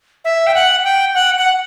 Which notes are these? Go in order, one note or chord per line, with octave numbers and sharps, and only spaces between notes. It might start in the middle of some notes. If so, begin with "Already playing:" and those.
E5
G5
F#5
G5
F#5
F#5